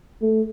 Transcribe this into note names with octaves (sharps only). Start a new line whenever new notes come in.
A3